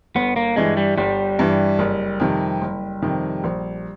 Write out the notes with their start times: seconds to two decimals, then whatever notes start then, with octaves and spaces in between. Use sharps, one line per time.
0.15 G1 B3
0.36 A#3
0.56 G2 E3 G#3
0.77 G3
0.98 G1 G3
1.39 G2 E3
1.79 F#1
2.20 F2 C3 D#3
2.61 F#1
3.02 F2 C3 D#3
3.44 A#1